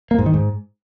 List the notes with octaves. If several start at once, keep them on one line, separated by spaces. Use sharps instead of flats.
A#3
G#2
D#3
G#2